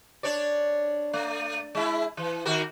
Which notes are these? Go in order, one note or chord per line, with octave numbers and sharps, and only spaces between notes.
D4 C#5 D5
A3
G#3 E4
E3
D#3 F#4 A#4